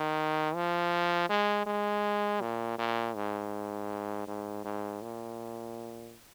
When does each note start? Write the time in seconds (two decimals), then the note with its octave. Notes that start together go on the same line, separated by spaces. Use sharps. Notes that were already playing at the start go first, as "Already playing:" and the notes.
Already playing: D#3
0.55 F3
1.30 G#3
1.66 G#3
2.41 A#2
2.79 A#2
3.15 G#2
4.27 G#2
4.65 G#2
5.02 A#2